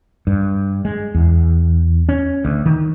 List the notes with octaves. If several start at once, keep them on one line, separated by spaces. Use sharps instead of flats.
G2
G#3
E2
C#4
D2
D#3